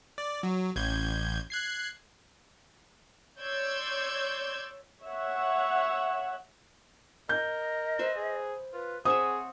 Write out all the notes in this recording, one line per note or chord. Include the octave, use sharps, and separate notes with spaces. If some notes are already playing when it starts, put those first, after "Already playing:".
D5
F#3
A1 G6 G#6
F#6 G#6 C7
C#5 D5 C6 E6 G6 G#6
C#5 E5 F#5
A#4 D#5 G6
B4 C5 E5
G#4
F4 B4
C4 G#4 C#5 E5 F#5 D#6